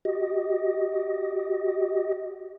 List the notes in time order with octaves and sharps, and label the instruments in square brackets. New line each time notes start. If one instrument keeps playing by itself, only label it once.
[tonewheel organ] F#4 G4 D#5